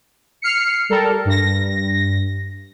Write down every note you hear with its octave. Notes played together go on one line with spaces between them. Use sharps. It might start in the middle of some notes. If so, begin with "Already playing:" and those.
F6 C7 C#7
G3 A4 A#4
G2 A#6